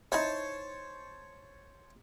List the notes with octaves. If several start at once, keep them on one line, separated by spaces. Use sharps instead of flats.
D#4 E4 C5 C#5 E5 A5